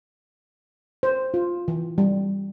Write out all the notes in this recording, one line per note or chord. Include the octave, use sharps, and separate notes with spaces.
C5
F4
E3
G3